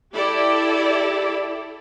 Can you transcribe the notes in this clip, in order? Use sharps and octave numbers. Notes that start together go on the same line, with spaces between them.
E4 G4 A4 D5